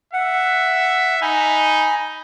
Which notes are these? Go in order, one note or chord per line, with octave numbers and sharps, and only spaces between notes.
E5 F#5
D#4 G#5 B5